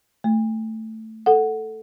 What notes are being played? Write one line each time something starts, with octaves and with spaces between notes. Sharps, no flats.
A3
A4 F#5